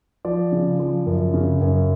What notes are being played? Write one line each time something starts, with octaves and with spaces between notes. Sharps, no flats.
F3 D5
C#3
F3
F#2
C#3
F#2